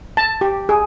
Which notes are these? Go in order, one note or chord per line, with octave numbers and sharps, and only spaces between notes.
A5
G4
G#4